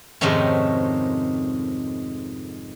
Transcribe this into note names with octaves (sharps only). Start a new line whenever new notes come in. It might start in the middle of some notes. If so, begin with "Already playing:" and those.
F2 G#2 C3 D#3 A3 C#4